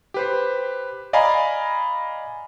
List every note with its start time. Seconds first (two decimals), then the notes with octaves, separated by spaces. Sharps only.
0.14 G4 B4 C5
1.13 D5 D#5 F5 G#5 A#5 B5